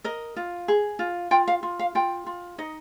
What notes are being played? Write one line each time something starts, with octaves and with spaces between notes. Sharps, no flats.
A#4 D#5
F4
G#4
F4
F4 G5
F5
F4
F5
F4 G5
F4
D#4 D#5